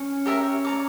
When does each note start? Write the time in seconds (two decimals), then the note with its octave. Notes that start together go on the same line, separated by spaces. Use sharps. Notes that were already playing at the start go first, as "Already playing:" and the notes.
Already playing: C#4
0.26 G4 A#4 E5 A#5
0.65 D5 A#5 D6